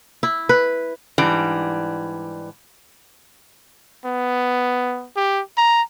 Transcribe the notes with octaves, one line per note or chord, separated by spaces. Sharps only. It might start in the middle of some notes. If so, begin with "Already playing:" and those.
E4
B4
G#2 E3 G3 D4
B3
G4
A#5